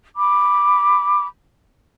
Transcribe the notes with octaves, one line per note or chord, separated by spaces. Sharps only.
B5 D6